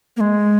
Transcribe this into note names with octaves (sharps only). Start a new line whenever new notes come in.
A#3
G#3